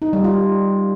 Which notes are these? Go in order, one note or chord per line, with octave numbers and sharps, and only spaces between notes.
D#4
G3
F4